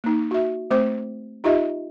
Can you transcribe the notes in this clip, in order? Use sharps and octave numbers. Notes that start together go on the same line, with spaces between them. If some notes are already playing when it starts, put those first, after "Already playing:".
A#3 D#4
F#4 E5
A3 C4 C5 D6
D#4 F4 G4 D#5 E5